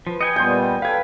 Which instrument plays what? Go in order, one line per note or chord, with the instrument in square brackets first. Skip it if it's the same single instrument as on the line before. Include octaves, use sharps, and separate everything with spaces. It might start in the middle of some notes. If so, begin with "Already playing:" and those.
[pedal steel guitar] F3 [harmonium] B4
[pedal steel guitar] D#5 G5 G#5 [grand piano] C#7
[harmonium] A#2 G3 B3 [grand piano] C6 G6
[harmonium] A4 G5 [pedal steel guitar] B4 [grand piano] F5 G#6